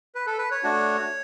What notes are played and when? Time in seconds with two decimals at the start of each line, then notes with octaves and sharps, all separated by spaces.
0.15 B4
0.26 A4
0.38 B4
0.51 C#5
0.63 A3 D4 F#4